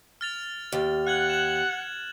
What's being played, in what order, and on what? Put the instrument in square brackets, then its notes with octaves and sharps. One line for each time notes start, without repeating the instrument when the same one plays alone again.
[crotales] F6 A6 F7
[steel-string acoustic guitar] D#2
[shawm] F#5 [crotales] F#6 G#6 F#7
[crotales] E7 F#7